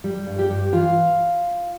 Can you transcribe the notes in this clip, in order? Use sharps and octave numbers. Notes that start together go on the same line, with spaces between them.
G3
G2
G4 G5
G2
E3 F4 F5